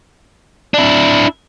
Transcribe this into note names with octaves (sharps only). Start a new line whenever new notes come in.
D4 E4